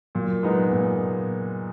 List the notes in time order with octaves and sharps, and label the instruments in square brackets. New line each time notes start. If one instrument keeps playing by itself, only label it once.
[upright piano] A#2 [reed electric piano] F#3
[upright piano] G#3 B3 D#4
A#2